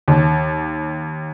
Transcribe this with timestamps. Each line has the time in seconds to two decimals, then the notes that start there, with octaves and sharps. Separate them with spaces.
0.08 D#2